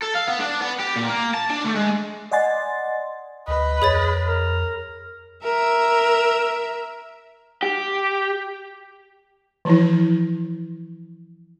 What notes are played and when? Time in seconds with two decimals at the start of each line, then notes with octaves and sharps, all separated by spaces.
0.03 A4
0.15 F5
0.28 B3
0.40 D4
0.61 B3
0.80 G4
0.96 A#2
1.09 A#3
1.34 A5
1.50 D4
1.65 A3
1.76 G#3
2.31 D5 D#5 F#5 G#5 C6 A6
3.48 D2 B4 D#5
3.82 F2 G#4 C#5 A6
4.27 A#4
5.43 A#4 E5
7.63 G4
9.65 E3 F3 E4